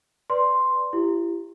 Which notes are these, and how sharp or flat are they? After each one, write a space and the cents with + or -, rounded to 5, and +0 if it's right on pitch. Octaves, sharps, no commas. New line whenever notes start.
B4 +10 D5 +0 C6 +0
E4 +35 G4 +0